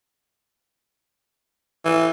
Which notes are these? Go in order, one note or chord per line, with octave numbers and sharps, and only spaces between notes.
E3